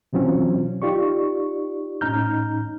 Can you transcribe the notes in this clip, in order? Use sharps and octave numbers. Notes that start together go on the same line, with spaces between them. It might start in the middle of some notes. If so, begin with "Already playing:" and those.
B2 E3 F#3 C4 C#4 F4
D#4 F4 G4 D5 C#6
A2 C#4 D#4 A#5 F6 G6